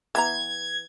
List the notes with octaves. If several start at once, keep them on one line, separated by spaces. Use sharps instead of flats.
E3 B3 A#5 G#6